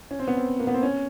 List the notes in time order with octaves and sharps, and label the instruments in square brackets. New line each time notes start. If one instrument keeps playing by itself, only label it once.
[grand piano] C#4
C4
B3
C4
A#3
B3
C4
C#4